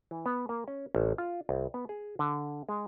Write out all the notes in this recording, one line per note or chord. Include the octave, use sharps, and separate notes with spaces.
E3
B3
A#3
C#4
A1
F4
C2
B3
G#4
D3
G#3